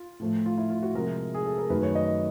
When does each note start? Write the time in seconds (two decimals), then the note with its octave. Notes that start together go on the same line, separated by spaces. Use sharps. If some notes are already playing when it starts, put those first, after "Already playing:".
Already playing: F4
0.20 A2 F3 A3
0.46 F4
0.58 E4
0.70 F4
0.83 F#4
0.95 C3 F3 G#3 A#4
1.34 G#4
1.46 A4
1.58 A#4
1.70 F#2 D#3 F#3 A3 B4
1.83 C#5
1.95 D#5